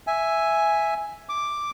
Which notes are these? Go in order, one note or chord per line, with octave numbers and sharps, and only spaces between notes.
E5 G#5
D6